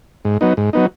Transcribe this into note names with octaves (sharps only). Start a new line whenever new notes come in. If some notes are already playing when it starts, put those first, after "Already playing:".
G#2
F#3 B3 D#4
G#2
F#3 B3 D#4